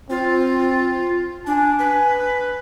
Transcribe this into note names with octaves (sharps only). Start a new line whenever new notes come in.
C4 F4
D4 G#5
B4